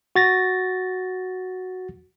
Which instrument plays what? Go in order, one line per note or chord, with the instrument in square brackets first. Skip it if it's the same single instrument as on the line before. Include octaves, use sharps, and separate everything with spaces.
[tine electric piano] F#4 A6 A#6